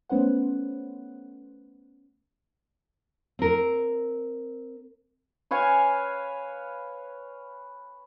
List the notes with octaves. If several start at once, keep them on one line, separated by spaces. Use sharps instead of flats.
A3 B3 C#4 B4 C5 F#5
C4 A#4
B4 C#5 F5 G#5